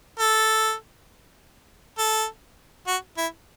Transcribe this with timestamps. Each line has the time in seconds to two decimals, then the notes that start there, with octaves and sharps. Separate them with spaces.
0.19 A4
1.98 A4
2.87 F#4
3.18 E4